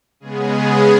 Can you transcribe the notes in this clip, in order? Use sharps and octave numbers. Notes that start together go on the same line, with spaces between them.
C#3 G#3 B3 G#4